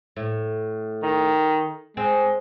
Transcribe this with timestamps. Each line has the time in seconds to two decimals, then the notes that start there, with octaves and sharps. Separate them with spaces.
0.16 A2
1.03 D#3
1.97 G#3 C4